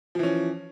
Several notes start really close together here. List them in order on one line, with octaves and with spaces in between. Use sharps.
F3 E3 C#4